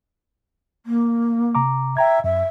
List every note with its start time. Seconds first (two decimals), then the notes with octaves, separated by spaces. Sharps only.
0.86 A#3
1.55 C3 A#5 D6
1.97 E5 G5 A#5 G#6
2.24 F#2 E5